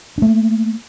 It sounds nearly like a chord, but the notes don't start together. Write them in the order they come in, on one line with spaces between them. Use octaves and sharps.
D4 A3 A#3